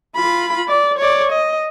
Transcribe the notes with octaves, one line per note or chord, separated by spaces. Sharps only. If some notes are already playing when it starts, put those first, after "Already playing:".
F4 B5
D5
C#5 D5
D#5